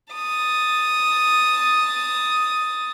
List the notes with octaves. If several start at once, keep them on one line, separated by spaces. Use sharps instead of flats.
A5 D#6